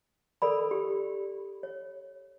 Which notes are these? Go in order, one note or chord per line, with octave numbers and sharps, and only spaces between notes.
A4 A#4 D5 B5
G4
C#5